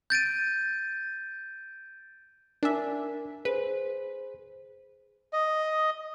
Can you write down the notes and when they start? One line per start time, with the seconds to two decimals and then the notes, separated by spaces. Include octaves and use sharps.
0.10 G6 A6 D7 D#7
2.63 D4 A#4 E5 G#5
3.45 G#4 B4 C5
5.33 D#5